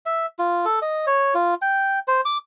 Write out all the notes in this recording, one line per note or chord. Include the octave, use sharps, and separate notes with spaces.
E5
F4
A4
D#5
C#5
F4
G5
C5
D6